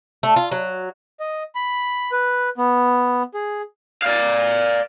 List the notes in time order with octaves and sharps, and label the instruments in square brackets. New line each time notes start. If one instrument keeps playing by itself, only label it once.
[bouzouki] A3
F4
F#3
[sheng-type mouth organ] D#5
B5
B4
B3
G#4
[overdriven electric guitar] D5 F5